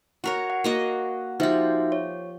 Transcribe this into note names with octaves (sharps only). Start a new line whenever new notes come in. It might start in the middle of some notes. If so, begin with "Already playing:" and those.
F#4 A#4 C#5
F#5
A#3 F#4 D#5
F3 D#4 F#4 G4 E5
C#5